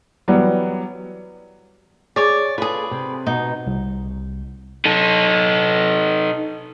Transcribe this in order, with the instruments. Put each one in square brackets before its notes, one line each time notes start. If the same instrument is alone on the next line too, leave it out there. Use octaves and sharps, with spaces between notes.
[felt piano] E3 F#3 G3 B3
[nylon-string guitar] G#4 [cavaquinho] C#5 D5
[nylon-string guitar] F4 A4 [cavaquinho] G#4 B4
[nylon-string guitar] C3 C4
[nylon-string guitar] B2 B3 D#5 [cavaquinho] D#4
[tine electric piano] C2
[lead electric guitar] D#4 A4